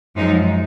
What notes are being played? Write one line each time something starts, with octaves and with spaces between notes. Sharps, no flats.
F#2 F3 G#3 D#4